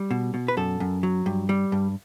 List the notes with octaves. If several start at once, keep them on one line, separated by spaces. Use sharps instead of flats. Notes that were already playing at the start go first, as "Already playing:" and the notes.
Already playing: G3
B2
B2
B4
F#2 A4
F#2
F#3
G2
G3
G2